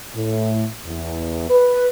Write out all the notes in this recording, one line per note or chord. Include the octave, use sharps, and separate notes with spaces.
A2
E2
B4